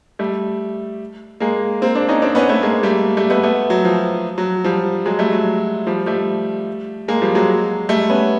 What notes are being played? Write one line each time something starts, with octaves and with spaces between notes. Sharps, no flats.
G3 A3
G#3 A#3
A#3 C4
C4 D4
C#4 D#4
C4 D4
B3 C#4
A3 B3
G#3 A#3
G3 A3
G3 A3
A3 B3
A3 B3
F#3
F3
F#3
F3 G3
F#3 G#3
G3 A3
F#3
F3 G3
G3 A3
G#3 A#3
F3 G3
F#3 G#3
G3 A3
B3 C#4